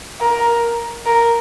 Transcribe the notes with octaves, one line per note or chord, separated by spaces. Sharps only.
A#4
A#4